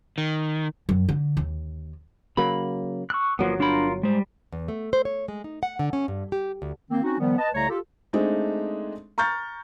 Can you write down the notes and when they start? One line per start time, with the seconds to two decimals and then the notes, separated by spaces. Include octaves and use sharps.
0.18 D#3
0.89 F#2
1.09 D3
1.37 D#2
2.37 C#3 F#3 A#3 B5
3.10 C#6 E6 F#6
3.39 G1 F3 F#3 A#3 B3
3.60 D4 F4 A#4 B5
4.03 G3 G#3 C5
4.53 E2
4.68 A3
4.93 C5
5.05 C#5
5.28 G#3
5.44 D#4
5.63 F#5
5.79 D3
5.93 C#4
6.08 G2
6.32 G4
6.62 D2
6.91 D#3 A#3 C4
7.03 C4 C#4 D#4 F#4
7.18 D#3 F3 G3 B3
7.38 B4 D#5 A5
7.55 C2 C#3 G3 A3 C#5 A#5
7.69 F4 G4 A4
8.13 G#3 A3 C4 D4 D#4 G#4
9.18 A#5 C#6 F6 G6 A6